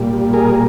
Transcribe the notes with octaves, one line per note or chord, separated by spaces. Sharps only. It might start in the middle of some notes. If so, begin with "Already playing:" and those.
Already playing: A#2 G3
G#4 A#4